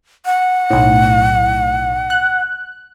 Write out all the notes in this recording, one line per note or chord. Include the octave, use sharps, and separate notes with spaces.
F#5
B1 A2
F#6